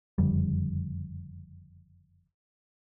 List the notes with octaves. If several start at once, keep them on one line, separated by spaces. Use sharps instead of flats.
F#1 F2 D3 G3